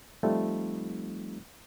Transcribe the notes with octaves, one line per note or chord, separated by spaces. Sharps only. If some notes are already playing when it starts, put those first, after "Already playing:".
F3 G3 A3 C4 D#4 F4